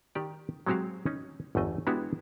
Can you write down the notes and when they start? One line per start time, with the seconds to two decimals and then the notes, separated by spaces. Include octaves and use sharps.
0.15 D#3 G4 D5
0.66 F#3 G#3 C4 F#4 G4 F5
1.06 C#4 D#4
1.55 G1 E2 A3 D#5
1.87 G#3 B3 D4 E4 F#4 G4